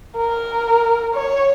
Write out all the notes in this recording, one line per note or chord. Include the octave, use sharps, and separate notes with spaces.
A#4
C#5